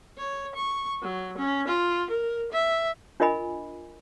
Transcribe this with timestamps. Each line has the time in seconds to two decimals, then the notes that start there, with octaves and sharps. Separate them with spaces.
0.18 C#5
0.55 C#6
1.02 F#3
1.37 C#4
1.67 F4
2.10 A#4
2.52 E5
3.20 D4 F4 A#4 D#5 G#5 B5